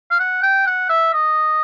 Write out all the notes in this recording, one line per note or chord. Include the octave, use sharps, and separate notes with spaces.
F5
F#5
G5
F#5
E5
D#5